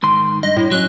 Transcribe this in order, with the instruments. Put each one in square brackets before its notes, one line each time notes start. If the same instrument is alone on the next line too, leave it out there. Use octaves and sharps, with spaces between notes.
[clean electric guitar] G#2 D#3 C6
[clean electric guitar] G2 [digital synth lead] D#5
[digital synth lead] A2
[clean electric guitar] F#3 C#4 [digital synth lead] F#6